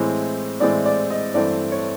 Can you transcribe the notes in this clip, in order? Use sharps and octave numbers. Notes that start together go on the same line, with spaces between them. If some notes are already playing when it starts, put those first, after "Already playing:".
Already playing: A2 E3 G#3 C4
A2 E3 G#3 C4 D5
D5
D#5
G2 E3 A3 C4 D5
C#5